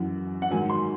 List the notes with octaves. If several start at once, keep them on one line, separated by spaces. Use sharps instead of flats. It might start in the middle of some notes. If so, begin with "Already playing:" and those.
Already playing: F#2 E3 F#5
F#5
G#2 D#3 F#3 G#5
C6